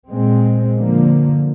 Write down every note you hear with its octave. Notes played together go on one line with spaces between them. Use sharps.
A#2 G#3 C4
D3 F3 A#3